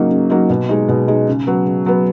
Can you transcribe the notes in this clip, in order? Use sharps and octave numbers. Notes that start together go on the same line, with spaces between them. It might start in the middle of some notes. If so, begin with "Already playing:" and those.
Already playing: C#3 F#3 A#3 D#4
C#3
F#3 A#3 D#4
B2
G#3 D#4
B2
G#3 D#4
C#3
F#3 B3
C#3
F#3 B3